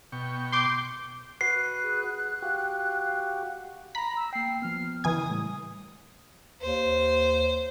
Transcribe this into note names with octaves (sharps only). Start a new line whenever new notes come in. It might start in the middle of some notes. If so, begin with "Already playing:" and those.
B2 G5 C#6
C6 D6 G6
F#4 B4 F#6 C7
G#4
F#4 G4 F5
A#5 B5
E6
A#3 G5 C7
F3 B3 F6
C#3 E3 G#5 D#6 G#6
A2 G3
D#2 C5